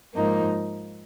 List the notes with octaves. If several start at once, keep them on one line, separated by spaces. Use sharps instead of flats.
G#2 F3 A#3 D#4